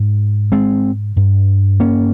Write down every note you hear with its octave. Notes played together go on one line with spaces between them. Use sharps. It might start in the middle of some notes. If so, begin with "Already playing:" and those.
Already playing: G#2
G#3 C4
G2
A#3 C#4